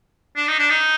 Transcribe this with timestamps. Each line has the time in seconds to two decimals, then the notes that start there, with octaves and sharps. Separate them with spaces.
0.36 D4
0.48 D#4
0.59 D4
0.70 D#4